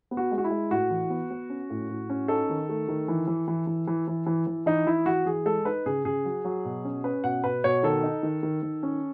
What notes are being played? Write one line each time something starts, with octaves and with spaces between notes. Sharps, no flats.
B3
F#4
G#3
F#4
E4
G#3
A2 F#4
E3
B3
B3
C#4
A2
A2
C#4
D#4 A4
D#3
A3
D#3
E3
E3
E3
E3
E3
E3
E3
E3
E3 D#4
E3 E4
E3 F#4
E3 G#4
G#3 A4
D#4 B4
C#3 G#4
C#3 G#4
F#3
F#3
B2
C#4
C#4 B4
B2 F#5
B2 B4
B2 C#5
D#3 A4
D#4
D#3
D#3
D#3
C#4